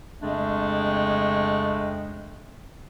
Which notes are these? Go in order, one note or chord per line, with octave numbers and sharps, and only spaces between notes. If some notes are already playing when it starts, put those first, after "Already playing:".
F2 C#3 G#3 A3 D4